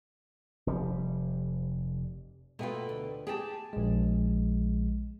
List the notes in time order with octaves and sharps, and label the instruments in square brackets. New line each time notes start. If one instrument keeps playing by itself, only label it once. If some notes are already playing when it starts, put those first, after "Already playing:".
[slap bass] F1 G3
[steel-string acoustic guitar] B2 B4 G5 [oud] A3 A#3 F4
[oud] D2
[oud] G4 [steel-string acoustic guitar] G#4 G5 A5
[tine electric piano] A#1 G#3